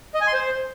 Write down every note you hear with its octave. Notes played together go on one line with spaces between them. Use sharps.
D#5
G#5
C6
C5